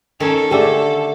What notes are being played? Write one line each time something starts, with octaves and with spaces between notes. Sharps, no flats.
D#3 C#4 A4
D3 A3 G4 G#4 D5